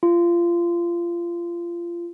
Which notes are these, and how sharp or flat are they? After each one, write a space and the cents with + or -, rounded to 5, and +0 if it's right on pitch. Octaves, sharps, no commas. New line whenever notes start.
F4 -25